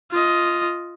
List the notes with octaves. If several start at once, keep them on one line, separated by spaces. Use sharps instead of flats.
F4 D#5